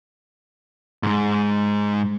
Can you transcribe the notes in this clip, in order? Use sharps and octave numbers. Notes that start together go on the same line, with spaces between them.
G#2 G#3